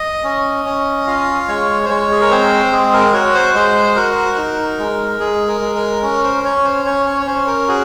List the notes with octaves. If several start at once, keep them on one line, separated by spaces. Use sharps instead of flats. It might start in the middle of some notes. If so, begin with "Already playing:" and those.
Already playing: D#5
C#4
C#4
F4 F5
G#3 C#5
C5
G#3 C#5
G#4
A#4
C4 C5
G#3 G#4
A#4
F#4 C#5
C5
G#3 C5
F#4 A#4
D#4
G#3
G#3 G#4
A#4
G#3
A#4
C#4 A#4
C5
C#4 C#5
C5
C#4 C#5
C#5
C#5
C#4 C5
A#4
F#4 G#4